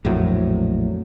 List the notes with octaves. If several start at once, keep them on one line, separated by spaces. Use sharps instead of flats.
A#1 F2 A2 F#3